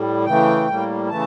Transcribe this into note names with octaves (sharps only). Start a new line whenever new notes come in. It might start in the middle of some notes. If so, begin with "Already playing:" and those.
Already playing: A2 G3
C#3 E3 A3 G5
A2 G3 A#3
C#3 E3 A3 A5